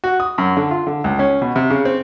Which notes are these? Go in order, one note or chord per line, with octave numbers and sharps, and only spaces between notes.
F#4
D#6
F#2
D3
F4
D3
C#2
C#4
B2
C3
C#3
C4